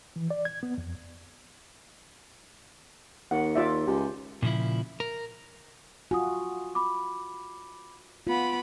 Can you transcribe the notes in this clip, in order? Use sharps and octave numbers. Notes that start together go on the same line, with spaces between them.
E3
D5
G#6
B3
F2
D#2 F#5
F4 D5 E5
C#2 G4
A#2 C#3 F3 E4
A#4
F4 F#4 G#5 D#6
B5 D6
B3 F4 B5 D6